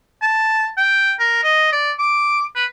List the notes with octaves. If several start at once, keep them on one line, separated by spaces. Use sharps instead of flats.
A5
G5
A#4
D#5
D5
D6
B4